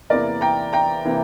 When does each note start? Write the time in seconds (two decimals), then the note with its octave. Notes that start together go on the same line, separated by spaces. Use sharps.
0.10 E2 C3 E3 A#3 A#4 D5
0.41 G5 A#5
0.73 G5 A#5
1.05 C3 E3 A#3